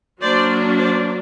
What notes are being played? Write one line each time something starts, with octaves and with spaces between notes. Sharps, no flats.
F#3 A#3 D4 C5 D5
C5 D5